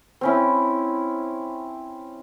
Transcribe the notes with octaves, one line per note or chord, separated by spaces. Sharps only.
C4 C#4 E4